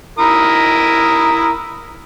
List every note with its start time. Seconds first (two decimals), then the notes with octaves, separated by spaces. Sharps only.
0.19 E4 A#4 D#6